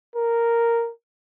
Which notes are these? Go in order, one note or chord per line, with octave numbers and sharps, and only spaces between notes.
A#4